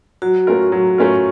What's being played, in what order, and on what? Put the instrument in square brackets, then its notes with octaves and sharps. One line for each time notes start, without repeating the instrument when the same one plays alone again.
[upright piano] F#3 [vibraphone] F#4
[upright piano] A3 C#4 F4 A#4
F#3
A3 C#4 F4 A#4